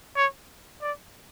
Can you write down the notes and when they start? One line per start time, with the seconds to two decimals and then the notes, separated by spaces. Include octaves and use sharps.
0.16 C#5
0.82 D5